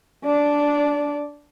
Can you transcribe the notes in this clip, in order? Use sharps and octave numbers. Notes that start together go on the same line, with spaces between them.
D4 D5